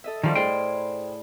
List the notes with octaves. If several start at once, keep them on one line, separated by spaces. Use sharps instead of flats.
A4 D#5 E5
G2 D#3 F3 G3 B5 F6
A2 G#4 C5 D5 G5